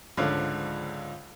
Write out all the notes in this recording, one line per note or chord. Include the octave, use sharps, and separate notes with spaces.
C#2 G#2 D3 F3 C#5 F5